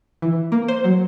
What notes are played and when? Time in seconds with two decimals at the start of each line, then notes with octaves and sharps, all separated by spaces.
0.22 E3
0.52 A#3
0.68 C5
0.84 F#3